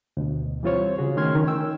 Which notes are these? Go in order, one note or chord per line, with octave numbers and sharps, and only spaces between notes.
D2 B2
E3 G3 C4 F4 C5 C#5
C#3 C#4 F#4 G#4
D#3 A3 C#4 C6 F6 G#6
D#3 C#4
G5 E6